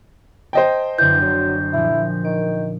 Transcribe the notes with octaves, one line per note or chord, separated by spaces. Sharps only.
C5 D#5 G5 A5
F#2 D3 E3 C6 G6
F#1 F#3
A#2 F3 E4
D#3 D7